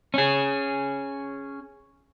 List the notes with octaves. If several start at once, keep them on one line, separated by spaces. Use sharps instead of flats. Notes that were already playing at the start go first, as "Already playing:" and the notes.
C#4 G#4